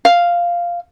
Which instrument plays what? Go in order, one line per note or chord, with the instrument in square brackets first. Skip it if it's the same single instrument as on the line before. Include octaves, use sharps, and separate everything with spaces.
[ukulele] F5